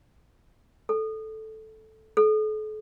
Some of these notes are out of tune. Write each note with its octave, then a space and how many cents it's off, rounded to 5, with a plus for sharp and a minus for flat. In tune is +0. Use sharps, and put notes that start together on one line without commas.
A4 -5
A4 -40